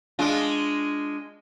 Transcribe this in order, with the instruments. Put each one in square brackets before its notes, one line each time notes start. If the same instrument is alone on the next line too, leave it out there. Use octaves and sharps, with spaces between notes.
[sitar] G#3 D4 F4